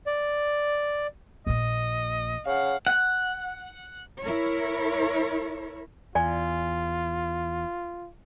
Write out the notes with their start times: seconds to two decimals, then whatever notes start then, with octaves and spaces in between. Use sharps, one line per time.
0.06 D5
1.47 A#1 A#2 D#5
2.46 C#3 F5 F#5
2.87 F#5
4.20 E4 A#4 C#5
6.15 E2 F4 D5 G#5